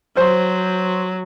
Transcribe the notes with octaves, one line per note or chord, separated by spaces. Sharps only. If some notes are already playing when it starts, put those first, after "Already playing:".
F#3 C5